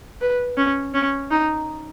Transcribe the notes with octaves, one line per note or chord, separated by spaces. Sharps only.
B4
C#4
C#4
D#4